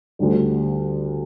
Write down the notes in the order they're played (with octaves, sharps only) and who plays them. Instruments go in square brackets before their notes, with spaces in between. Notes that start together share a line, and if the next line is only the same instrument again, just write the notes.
[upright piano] D2 D3 G3